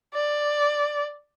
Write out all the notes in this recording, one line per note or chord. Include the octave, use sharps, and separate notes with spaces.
D5